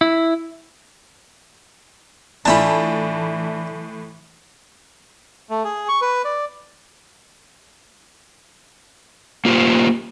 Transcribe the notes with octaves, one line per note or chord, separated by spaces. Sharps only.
E4
A2 E3 D4 E4 F4 G#5 A5 B5
A3
G#4
C#6
B4
D5
A#3 F4 G4 C5